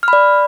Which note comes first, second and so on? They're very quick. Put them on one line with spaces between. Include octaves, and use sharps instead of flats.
F6 B5 D5